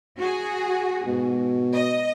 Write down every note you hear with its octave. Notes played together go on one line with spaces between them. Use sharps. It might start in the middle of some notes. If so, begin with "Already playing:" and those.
F#4 G#4
G#2 B2
D#5